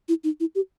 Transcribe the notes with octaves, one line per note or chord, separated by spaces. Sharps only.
E4
D#4
E4
G4